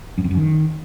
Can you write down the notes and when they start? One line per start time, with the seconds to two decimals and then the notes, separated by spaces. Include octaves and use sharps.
0.18 F#2
0.24 F2
0.31 F#2
0.37 D#3